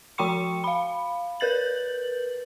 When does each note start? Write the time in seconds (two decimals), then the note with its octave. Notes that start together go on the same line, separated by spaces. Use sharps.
0.18 F3 F#4 G5 C6 C#6 C#7
0.64 F5 B5
1.40 A#4 B4 G6 A6 F#7